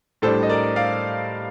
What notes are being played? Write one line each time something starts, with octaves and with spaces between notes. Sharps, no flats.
A2 G3 D4 A4 C5
D#5
A#4 D5
D5 F5